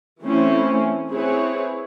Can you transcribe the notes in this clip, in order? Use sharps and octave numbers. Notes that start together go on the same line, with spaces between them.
E3 A3 C4 C#4 E4
C4 E4 G#4 B4 C#5